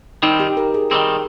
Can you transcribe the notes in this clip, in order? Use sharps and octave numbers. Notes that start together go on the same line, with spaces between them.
D#3 G3 C4 D#4
G4
A#4
G#4
D#3 G3 C4